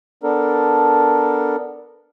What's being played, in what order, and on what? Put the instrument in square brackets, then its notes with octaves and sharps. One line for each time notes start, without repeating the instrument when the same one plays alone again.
[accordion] B3 D4 A4 A#4